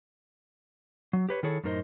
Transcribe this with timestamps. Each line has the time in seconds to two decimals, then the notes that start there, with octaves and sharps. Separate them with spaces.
1.13 F#3
1.29 G4 B4 C#5
1.43 D#3 E4 G#4 A4 C#5
1.64 F#2 A2 D#4 A#4 C5 D#5